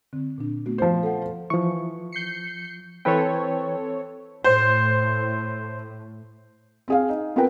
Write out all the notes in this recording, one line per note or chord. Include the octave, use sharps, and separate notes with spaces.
D3 C4
A#2 D4
A3 B3 F#4
F3 C5
A4 F#5
E3 F3 C#6
G6 C7 C#7
E3 C4 A4 B4 C#5 G5
A2 C5
C4 G#4 F5
D#4
B3 C4 F4 A#4 B4 G5